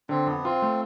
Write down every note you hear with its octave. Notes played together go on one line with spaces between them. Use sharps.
D3 C4
F2 B3
C4 F4
A3